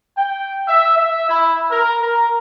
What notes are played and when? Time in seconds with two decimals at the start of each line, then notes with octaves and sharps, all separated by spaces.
0.17 G5
0.69 E5
0.97 E5
1.30 E4
1.71 A#4
2.02 A#4